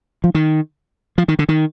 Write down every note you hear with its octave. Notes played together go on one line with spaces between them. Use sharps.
F3
D#3
F3
D#3
D3
D#3